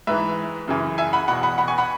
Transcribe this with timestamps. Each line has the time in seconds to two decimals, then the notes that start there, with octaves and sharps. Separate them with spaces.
0.07 G#2 E3 B4 E5
0.68 F#2 C#3 E3
0.98 E5 G#5
1.13 F#5 B5
1.28 E2 B2 F#5 B5
1.43 F#5 B5
1.58 F#5 B5
1.68 G#5 C#6
1.78 F#5 B5